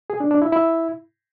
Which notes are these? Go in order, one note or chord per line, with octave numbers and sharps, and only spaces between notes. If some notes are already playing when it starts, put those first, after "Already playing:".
G#4
D4
D4
E4
E4